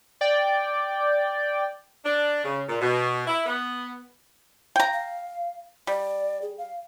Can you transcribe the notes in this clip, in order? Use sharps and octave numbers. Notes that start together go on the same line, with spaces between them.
D5 G5
D4
C#3
A#2
B2
E4
B3
F5 G5 A#5
F5
G3 D5
G#4
F5